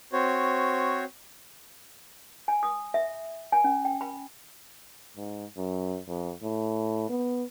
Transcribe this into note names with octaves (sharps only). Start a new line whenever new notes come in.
C4 F#4 C5 C#5
G#5
D#6
E5
G#5
C#4
G5
B5
G#2
F#2
F2
A2
B3